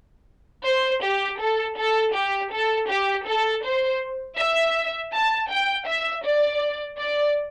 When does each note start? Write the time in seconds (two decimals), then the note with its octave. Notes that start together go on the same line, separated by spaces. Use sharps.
0.65 C5
1.02 G4
1.39 A4
1.77 A4
2.14 G4
2.51 A4
2.89 G4
3.26 A4
3.64 C5
4.38 E5
5.13 A5
5.49 G5
5.86 E5
6.24 D5
6.99 D5